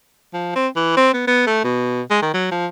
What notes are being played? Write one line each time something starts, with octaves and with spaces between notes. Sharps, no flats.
F3
C4
E3
C4
B3
B3
A3
B2
G#3
D#3
F#3
F3